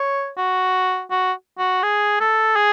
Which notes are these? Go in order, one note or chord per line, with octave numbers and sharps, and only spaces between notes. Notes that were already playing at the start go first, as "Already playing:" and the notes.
Already playing: C#5
F#4
F#4
F#4
G#4
A4
G#4